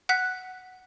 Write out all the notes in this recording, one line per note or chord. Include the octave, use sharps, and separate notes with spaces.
F#5 F#6 B6